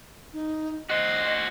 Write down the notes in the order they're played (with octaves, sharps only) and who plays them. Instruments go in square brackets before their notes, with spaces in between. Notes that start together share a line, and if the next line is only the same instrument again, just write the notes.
[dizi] D#4
[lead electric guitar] F#4 C5 [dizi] D#5